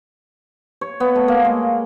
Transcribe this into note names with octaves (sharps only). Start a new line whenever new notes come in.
C#5
B3
A3
A#3
G#3